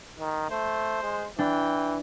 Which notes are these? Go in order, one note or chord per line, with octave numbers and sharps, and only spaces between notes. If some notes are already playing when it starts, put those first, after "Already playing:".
D#3
A3 C5
G#3
E3 D4 G5